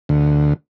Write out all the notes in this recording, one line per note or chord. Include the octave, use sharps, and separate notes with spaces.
D2